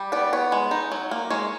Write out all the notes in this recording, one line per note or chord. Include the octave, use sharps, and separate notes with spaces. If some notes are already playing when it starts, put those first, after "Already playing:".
Already playing: G3
B3 D5
B3 C#5
G#3
D#4
F#3
A#3
G#3 C#5